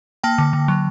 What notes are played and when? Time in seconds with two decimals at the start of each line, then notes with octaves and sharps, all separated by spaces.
0.24 A#3 G5 A5
0.38 D3
0.53 D3
0.68 F#3